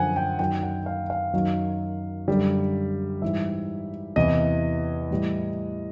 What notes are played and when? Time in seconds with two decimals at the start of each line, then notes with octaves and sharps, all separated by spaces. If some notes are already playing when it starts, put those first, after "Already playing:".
Already playing: F#2 D3 F3 F#5 G#5
0.16 G5
0.39 F#2 D#3 F#3 G5
0.63 F#5
0.86 F5
1.10 F5
1.33 F#2 D#3 F#3
2.28 F#2 D3 G3
3.22 G#2 E3 G3 E5
4.16 E2 C3 E3 D#5
5.11 A2 E3 G3